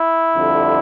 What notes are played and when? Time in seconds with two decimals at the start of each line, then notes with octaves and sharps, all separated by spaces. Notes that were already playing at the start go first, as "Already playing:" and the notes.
Already playing: E4
0.35 F2 D3 G3